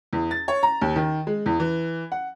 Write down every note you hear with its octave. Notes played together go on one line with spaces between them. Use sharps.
E2
A6
C#5
A#5
D#2
D#3
G#3
E2
E3
F#5